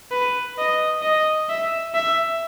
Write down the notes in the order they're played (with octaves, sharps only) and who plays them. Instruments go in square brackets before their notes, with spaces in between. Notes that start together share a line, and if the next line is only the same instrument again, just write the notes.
[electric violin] B4
D#5
D#5
E5
E5